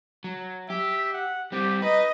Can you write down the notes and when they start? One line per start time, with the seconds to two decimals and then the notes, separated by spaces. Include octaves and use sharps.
0.24 F#3
0.70 G4 E5
1.13 F#5
1.52 G3 C4 G4
1.82 D#4 B4 D#5